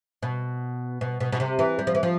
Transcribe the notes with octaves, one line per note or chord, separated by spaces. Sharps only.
B2
B2
B2
B2
C3
E3
G3
F3
E3
F3